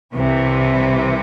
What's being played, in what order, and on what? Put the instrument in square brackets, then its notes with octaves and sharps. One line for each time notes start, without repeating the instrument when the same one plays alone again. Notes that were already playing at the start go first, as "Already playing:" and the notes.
[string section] C2 C3 E3